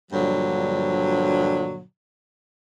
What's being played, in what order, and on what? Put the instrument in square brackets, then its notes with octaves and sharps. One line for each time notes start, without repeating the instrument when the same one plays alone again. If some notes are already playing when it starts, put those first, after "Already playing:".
[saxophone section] G2 A#2 D3 F3 F#3